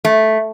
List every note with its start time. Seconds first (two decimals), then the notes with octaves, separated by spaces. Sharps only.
0.05 A3